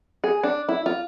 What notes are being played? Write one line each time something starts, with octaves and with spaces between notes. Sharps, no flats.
G#4
D4
E4
F4